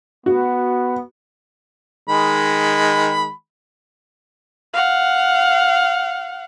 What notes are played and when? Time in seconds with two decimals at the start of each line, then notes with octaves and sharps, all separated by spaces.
0.26 B3 F#4
2.08 D#3 G#3 B5
4.74 F5 F#5